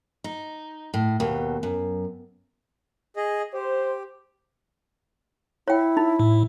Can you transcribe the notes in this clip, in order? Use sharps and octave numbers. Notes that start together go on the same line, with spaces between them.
D#4
A2
D#2 B2
F#2
G#4 D#5
G4 C5
E4 C#5 G5
D#4
A2